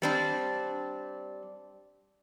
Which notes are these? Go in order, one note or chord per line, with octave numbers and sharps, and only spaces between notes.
G3 C4 D4